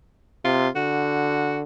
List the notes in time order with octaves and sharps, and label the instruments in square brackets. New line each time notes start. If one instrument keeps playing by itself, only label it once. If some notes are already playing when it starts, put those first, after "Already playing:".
[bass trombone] C3 [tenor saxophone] F4
[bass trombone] D3 [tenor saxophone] F#4